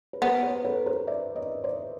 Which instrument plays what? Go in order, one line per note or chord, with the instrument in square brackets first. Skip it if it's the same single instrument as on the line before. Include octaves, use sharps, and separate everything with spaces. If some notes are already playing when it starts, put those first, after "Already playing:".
[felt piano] B4
[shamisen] B3 [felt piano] A#4 C5
[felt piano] B4 C#5
A4 B4
A#4 C5
D5 E5
C#5 D#5
C5 D5